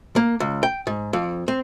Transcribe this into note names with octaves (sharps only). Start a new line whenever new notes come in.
A#3
C#2
G5
G#2
F2
C4